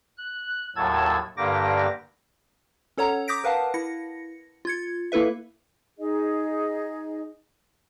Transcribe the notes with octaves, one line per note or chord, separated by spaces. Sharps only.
F#6
D#2 A2 F#3 A5 E6 G#6
G2 D3 A#3 G4 D6 A#6
C#4 A4 C#5 F#5 A#5
D6 D#6 G6 A#6 B6 D7
A#4 B4 F5 F#5 A5
E4 A#6 C#7
F4 G#6 C#7
A#3 E4 A4 B4 E5
D#4 G#4 D#5